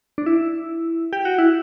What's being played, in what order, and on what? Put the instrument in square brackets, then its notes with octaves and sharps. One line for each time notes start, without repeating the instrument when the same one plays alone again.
[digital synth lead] D4
E4
G4
F#4
E4